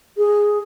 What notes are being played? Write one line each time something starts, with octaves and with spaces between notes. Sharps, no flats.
G#4